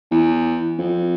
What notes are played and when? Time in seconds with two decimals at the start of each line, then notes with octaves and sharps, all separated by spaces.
0.11 E2
0.78 F2